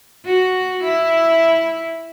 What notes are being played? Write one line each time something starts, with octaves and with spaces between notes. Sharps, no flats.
F#4
E4